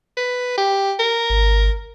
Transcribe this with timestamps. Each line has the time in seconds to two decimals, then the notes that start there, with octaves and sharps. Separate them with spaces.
0.17 B4
0.58 G4
0.99 A#4
1.30 G#1